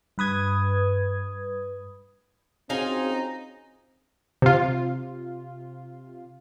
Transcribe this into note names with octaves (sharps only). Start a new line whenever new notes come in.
G2 B4 D#6 G#6
C4 C#4 D#4 F4 F#4 G#4 G#5
C3 F4